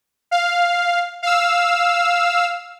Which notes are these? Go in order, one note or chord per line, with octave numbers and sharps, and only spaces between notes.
F5
F5 E6